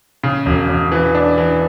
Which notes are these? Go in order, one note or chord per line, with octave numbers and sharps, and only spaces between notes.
C#3
E1
E1
E3
D4
E3